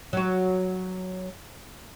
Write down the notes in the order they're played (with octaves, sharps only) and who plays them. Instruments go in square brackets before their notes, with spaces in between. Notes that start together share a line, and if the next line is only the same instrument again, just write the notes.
[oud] F#3 F#4